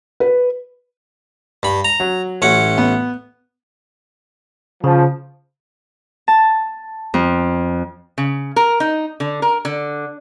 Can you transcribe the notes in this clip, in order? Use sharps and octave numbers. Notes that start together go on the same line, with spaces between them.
B4
G2 B5
A#5
F#3
A1 C#4 F#5
B3
C#3 F3
A5
F2
C#3
A#4
D#4
D3
A#4
D3